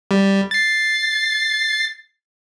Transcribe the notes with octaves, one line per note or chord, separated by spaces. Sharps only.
G3
A6 C7